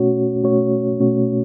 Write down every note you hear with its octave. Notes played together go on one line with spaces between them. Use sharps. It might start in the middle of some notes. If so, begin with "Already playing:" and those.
Already playing: B2 A3 C#4 F#4 C#5
B2 A3 C#4 F#4 C#5
B2 A3 C#4 F#4 C#5